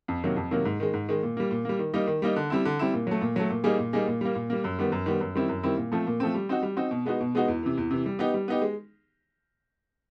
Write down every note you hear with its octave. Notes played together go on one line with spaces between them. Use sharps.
F2
C3 D#3 F#3 A#3
F2
C3 D#3 F#3 A#3
G#2
D#3 G#3
G#2
D#3 G#3
A#2
G3 A#3
A#2
G3 A#3
D#3
G3 A#3 D#4
D#3
G3 A#3 D#4
D3
G3 C4 E4
D3
G3 C4 E4
A#2
F#3 A3
A#2
F#3 A3
A#2
G3 A#3 D#4 G#4
A#2
G3 A#3 D#4 G#4
A#2
G3 A#3
A#2
G3 A#3
F#2
D#3 G3 B3
F#2
D#3 G3 B3
F#2
D#3 G3 C4 E4
F#2
D#3 G3 C4 E4
A#2
F3 A3 C4
A#2
F3 A3 C4
G3
C4 D#4 F#4
G3
C4 D#4 F#4
B2
G#3 B3 D#4 F#4
B2
G#3 B3 D#4 F#4
E2
C3 E3
E2
C3 E3
G3
B3 D#4 G4
G3
B3 D#4 G4
G#3